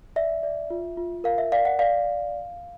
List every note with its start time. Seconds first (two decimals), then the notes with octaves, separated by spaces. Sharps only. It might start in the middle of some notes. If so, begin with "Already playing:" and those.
0.16 D5 E5
0.43 D5
0.70 F4
0.97 F4
1.24 A#4 F5
1.38 E5
1.52 D5 F5
1.65 F#5
1.79 D5 F5